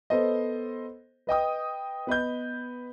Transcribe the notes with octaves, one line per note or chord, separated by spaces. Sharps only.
B3 A4 C5 D#5
B4 D#5 G5 D#6
B3 B4 D#5 G6